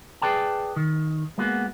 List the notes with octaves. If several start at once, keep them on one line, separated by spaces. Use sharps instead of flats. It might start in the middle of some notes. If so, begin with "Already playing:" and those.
G#4 A#4 B4 D5 G5 A5
D#3
G#3 A#3 B3 F#4